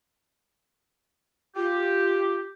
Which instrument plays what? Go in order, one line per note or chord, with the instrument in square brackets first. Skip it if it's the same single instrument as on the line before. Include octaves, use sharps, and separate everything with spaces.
[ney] F4 [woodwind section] G4